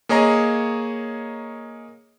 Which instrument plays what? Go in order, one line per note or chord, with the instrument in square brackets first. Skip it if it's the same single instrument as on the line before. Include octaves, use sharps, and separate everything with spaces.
[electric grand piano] A#3 G#4 C#5 D#5 A#5